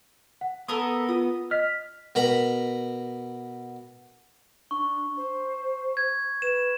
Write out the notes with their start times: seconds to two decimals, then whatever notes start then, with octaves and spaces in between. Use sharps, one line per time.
0.41 F#5
0.68 B3 A4 A#4 D#6
1.09 F4 D#6
1.51 D#5 F6 B6
2.15 B2 A#4 A#5 B5
4.71 D4 C#6
5.17 C5
5.97 G#6
6.42 B4 E7